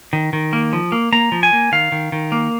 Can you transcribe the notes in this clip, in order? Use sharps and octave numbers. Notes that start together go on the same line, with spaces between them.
D#3
D#3
A#3
F3
A#3
A#3 A#5
F3
G#5
A#3
D#3 F5
D#3
D#3
A#3